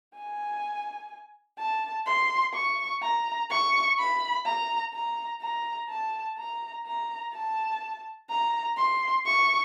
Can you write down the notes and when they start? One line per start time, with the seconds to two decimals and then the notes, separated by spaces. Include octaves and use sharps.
0.15 G#5
1.59 A5
2.06 C6
2.54 C#6
3.02 A#5
3.51 C#6
3.99 B5
4.46 A#5
4.94 A#5
5.42 A#5
5.89 A5
6.38 A#5
6.86 A#5
7.33 A5
8.30 A#5
8.78 C6
9.26 C#6